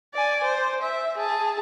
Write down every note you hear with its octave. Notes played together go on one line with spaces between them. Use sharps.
D5 G#5
C5
E5
G#4 A5